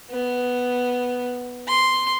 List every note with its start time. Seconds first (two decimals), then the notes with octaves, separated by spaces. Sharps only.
0.10 B3
1.68 C6